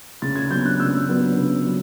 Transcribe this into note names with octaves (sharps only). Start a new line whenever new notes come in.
C#3 A6
G#6
F#3 B3 D4 G6
F#6
C#3 E6
F#3 B3 D4
C#3
F#3